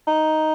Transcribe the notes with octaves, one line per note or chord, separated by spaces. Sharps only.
D#4